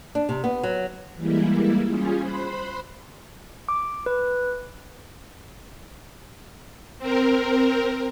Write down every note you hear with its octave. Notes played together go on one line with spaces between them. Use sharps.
D4
C3
B3
F#3
E3 G3 G#3 A#3 E4
G3 C#4 F4 G#4
C5 B5 C6 F#6
D6
B4
C4 A#4